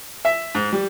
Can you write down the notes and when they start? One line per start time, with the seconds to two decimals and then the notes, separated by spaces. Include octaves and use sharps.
0.25 E5
0.55 G#2
0.73 G3